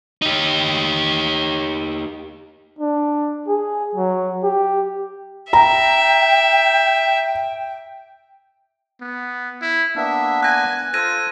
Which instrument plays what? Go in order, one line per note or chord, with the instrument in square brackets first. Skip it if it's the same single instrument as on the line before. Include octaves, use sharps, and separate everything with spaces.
[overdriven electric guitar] D#4 G4
[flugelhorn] D4
G#4
F#3
G4
[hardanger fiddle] E5 [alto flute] G5 [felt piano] A#5
[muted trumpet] B3
E4
[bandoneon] A#3 B3 D4 [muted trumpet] E5
[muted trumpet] G#5 [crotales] F#6 A#6
[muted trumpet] F4 [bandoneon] A4 C5 [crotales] G#6 A#6 D#7